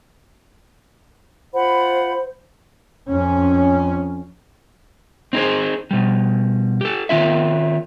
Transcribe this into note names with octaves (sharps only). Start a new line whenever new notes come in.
F4 C5 F#5 B5
F2 C#4
C4 D#4 G#4 C5
B2 G3
G4 A4
D#3 C4 F4 E5